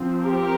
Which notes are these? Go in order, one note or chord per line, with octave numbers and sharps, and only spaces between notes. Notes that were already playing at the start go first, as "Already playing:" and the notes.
Already playing: F3 C4
G4 A#4